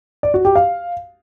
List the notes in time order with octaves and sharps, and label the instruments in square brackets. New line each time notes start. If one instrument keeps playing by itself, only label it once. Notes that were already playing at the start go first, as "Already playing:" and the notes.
[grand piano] D5
F#4
G4
F5